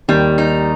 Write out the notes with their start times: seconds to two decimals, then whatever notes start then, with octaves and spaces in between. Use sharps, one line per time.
0.08 D#2 D#3 G3
0.38 D#4